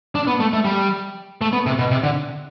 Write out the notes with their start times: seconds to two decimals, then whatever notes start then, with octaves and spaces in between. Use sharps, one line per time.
0.15 D4
0.27 B3
0.40 A3
0.53 A3
0.65 G3
1.41 A3
1.53 B3
1.66 C3
1.79 B2
1.91 C3
2.03 D3